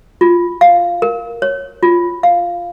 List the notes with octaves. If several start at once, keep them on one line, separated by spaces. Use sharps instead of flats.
F4
F5
A#4
C#5
F4
F5